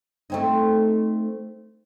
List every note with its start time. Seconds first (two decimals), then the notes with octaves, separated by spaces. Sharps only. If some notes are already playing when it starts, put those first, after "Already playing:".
0.30 A3 C4 D#4